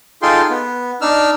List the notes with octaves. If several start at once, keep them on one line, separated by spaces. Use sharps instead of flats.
D#4 F4 G#4 A4 G5 C6
B3
D4 D#4 E6 F6